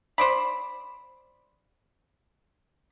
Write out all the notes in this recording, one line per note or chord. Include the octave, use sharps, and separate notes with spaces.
C5 D5 B5